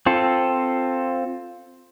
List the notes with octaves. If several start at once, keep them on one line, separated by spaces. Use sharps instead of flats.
C4 F4 A4